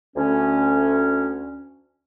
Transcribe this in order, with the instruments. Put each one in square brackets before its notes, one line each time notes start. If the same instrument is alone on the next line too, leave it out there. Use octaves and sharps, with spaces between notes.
[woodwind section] D2 C#4